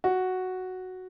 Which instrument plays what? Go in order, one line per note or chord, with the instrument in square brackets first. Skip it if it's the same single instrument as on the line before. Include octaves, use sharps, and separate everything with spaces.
[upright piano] F#4